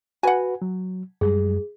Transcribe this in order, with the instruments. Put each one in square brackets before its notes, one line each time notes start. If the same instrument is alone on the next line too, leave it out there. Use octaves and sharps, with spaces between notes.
[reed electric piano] F#4 B4 [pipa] F#5 G#5
[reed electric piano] F#3
[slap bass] F#2 G#3 [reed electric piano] G3 [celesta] G#4